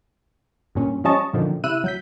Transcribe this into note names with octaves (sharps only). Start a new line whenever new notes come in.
G2 A#2 C#4
F3 G3 C#4 D#5 A5 C#6
F#2 A#2 D3 D#3 F3
C3 E4 E6 F#6 D#7
F#3 G6 B6